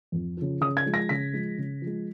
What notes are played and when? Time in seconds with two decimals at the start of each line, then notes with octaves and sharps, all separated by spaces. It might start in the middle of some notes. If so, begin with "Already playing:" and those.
0.12 F2
0.37 C#3 F3
0.61 C#3 D#6
0.77 G#6
0.86 F3 G#3
0.94 A#6
1.09 C#3 B6
1.33 F3 G#3
1.58 C#3
1.82 F3 G#3